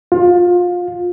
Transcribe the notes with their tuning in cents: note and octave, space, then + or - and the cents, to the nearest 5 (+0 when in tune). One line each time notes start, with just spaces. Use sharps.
F4 +25